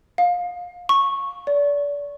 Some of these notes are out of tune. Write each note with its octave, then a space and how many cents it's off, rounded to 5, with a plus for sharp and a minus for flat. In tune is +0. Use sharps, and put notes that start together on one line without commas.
F5 +25
C#6 -10
D5 -35